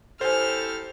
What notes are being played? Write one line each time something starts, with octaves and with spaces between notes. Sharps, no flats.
E4 G4 A4 C5 G#5 F6